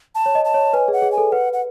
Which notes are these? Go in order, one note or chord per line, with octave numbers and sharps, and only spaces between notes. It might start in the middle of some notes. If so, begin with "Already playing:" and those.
A5
C#5
D#5
A5
C#5
B4 G#5
G#4
F#5
G#4
G#5
A4
B4 F#5
F#5